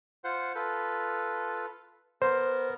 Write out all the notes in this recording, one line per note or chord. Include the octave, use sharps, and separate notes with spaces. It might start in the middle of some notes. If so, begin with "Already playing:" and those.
F4 C5 F#5
F4 A4 B4
B3 A#4 C5